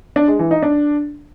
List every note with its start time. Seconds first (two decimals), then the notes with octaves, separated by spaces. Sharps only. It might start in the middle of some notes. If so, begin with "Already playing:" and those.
0.16 D4
0.28 G#3
0.39 E3
0.51 D#4
0.63 D4